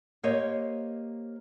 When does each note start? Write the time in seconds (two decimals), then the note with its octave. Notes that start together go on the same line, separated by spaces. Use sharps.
0.23 A#3 G4 C5 C#5 D#5